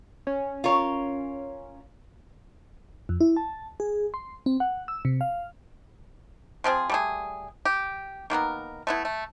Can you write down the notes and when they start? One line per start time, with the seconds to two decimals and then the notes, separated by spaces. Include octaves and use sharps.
0.27 C#4
0.64 F4 A#4 C#5
3.09 F2
3.21 E4
3.37 A5
3.80 G#4
4.14 C6
4.46 C4
4.60 F#5
4.88 E6
5.05 C3
5.21 F5
6.64 F3 C4 F4 G#4
6.90 G3 A3 G#4
7.65 G4
8.30 D#3 A#3 B3 A#4
8.87 A3 B3 E4
9.05 A3